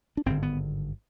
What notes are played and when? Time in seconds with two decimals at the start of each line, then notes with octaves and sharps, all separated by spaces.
0.17 D4
0.26 G#1 G2 D3 C4
0.43 B3